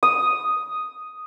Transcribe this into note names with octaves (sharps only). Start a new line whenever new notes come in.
D#6